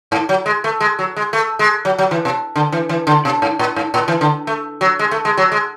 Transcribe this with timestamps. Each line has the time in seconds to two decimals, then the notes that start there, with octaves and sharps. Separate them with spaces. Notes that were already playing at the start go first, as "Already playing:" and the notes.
0.12 G#2
0.29 F#3
0.46 G#3
0.64 A3
0.80 G#3
0.99 F#3
1.17 G#3
1.33 A3
1.59 G#3
1.85 F#3
1.98 F#3
2.11 E3
2.25 B2
2.56 D3
2.72 E3
2.89 E3
3.07 D3
3.25 B2
3.42 G#2
3.59 A2
3.76 G#2
3.94 A2
4.08 E3
4.21 D3
4.47 A3
4.81 F#3
4.99 G#3
5.11 A3
5.25 G#3
5.38 F#3
5.52 G#3